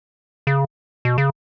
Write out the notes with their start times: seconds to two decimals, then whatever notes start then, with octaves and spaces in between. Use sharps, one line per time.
0.47 C#3
1.05 B2
1.18 C#3